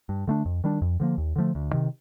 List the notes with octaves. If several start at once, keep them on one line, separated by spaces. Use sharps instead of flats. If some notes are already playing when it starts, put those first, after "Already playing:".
G2
D3 A3 D4
F2
D#3 G3 D4
F2
D3 F3 A#3
D#2
D3 F3 A3
D2
C3 D#3